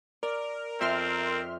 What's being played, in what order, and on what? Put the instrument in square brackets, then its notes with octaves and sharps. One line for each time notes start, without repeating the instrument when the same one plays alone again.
[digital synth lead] A#4 [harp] D5
[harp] F2 [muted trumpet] C4 [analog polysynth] E5 C6 F6